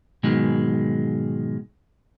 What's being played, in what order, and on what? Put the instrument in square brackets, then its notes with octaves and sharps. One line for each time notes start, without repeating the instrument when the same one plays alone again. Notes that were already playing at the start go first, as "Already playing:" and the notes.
[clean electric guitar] G#2 B2 D#3 F#3 G#3